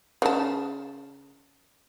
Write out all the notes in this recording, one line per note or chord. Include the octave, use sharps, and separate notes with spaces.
C#3 A5